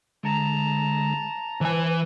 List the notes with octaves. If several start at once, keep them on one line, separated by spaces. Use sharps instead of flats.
D3 G#3 A5 A#5
E3 B4 C5 G#5